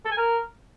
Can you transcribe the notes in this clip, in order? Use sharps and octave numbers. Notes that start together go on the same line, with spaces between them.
A4
G#5
A#4